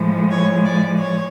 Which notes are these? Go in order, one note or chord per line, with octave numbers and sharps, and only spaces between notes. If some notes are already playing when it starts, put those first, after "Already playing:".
Already playing: A2 F3 G#3
C#5
D5
C#5